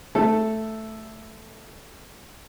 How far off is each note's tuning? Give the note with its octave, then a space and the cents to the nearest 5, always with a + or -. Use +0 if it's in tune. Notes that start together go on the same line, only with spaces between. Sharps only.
A3 +0 A4 +0